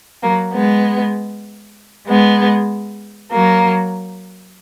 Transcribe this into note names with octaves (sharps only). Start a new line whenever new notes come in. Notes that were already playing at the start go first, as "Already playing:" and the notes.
F#3 A#3
G#3 B3
G#3 B3
F#3 A#3